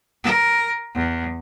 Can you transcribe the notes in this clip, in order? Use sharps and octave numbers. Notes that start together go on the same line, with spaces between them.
A#4
E2